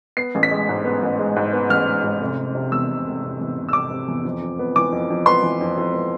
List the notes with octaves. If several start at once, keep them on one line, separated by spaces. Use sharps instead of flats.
B3 C7
A1
B6
G#3
G#2
B3
A1
G#3
G#2
B3
A1 F6
G#3
G#2
F1
F1
C3
E2 E6
F1
F1
C3
E2
F1
E6
F1 D6
C3
E2
F2
F2
B3
E3 D6
F2
F2
B3 C6
E3
F2
F2
B3